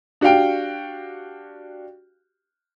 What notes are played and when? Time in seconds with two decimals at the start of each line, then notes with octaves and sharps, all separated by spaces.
0.21 D4 F#4 G4 F5 G5